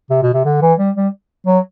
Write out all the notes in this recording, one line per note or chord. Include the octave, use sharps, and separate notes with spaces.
C3
B2
C3
D3
E3
G3
G3
F#3